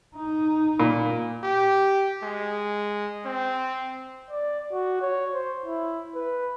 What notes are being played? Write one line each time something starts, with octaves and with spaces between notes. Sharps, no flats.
D#4
A#2
G4
G#3
C4
D5
F#4
C#5
C5
E4
B4